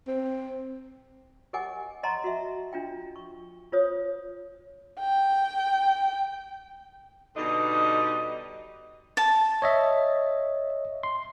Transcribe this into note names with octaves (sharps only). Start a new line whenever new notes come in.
C4
G4 A#4 D#5 F#5 G#5 D6
D#5 F#5 A5 A#5 C6 C#6
F#4 E5
D4 F4 G5
C#6
F4 C5 C#5 D#6
G5
B2 D3 G3 D#4 D#5
A5
C#5 D#5 E5
C6